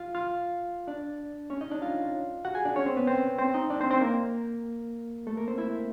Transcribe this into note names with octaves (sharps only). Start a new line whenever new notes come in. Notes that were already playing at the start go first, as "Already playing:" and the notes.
Already playing: F4 F5
F4 F5
D4 D5
C#4 C#5
D#4 D#5
D4 D5
F4 F5
F#4 F#5
G#4 G#5
D4 D5
C#4 C#5
C4 C5
B3 B4
C4 C5
C4 C5
D#4 D#5
D4 D5
C4 C5
C4 C5
A#3 A#4
A3 A4
A#3 A#4
C4 C5
E4 E5